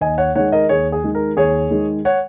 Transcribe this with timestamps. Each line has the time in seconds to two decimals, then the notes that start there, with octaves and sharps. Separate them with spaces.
0.01 D#2 D#5 G#5
0.18 C#5 F#5
0.35 D#3 G#3 C#5 F#5
0.52 A#4 D#5
0.69 D#2 G#4 C#5
0.92 G#4
1.04 D#3 G#3
1.15 A#4
1.37 D#2 G#4 C#5
1.71 D#3 G#3
2.05 C#5 F#5